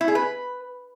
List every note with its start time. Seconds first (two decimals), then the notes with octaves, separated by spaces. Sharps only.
0.01 E4
0.08 G#4
0.15 B4